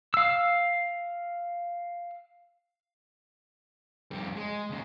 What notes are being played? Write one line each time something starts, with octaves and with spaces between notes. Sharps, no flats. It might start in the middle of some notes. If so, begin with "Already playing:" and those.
F5 E6
F2 G3
G#3
D#2 C#3